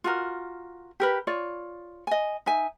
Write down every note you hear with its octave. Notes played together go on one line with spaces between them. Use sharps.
F4 F#4 A#4
G4 A#4 B4
F4 C#5 D5
D#5 G#5
D#4 E5 G#5